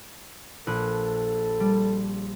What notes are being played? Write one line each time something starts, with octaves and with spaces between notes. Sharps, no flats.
A#1 A4 F#6 D#7
G3